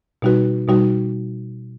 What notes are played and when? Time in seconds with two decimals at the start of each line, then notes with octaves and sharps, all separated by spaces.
0.22 B2 G3 D#4 F#4 B4
0.68 B2 G3 D#4 F#4 B4